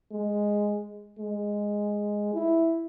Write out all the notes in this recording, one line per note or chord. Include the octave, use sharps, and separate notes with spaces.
G#3
G#3
E4